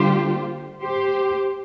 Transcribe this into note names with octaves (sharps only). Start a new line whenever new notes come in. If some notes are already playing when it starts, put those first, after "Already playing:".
Already playing: D3 G3 A#3 F4 G4 C5
G4 C5